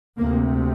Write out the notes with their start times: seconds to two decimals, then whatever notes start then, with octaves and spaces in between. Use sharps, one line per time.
0.17 D2 C3 A#3